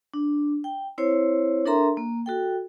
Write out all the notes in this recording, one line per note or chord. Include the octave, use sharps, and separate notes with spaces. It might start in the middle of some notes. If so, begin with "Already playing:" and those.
D4
G5
C4 E4 C5 C#5
D4 A4 A#4 E5 A#5 C6
A#3
F#4 A4 G5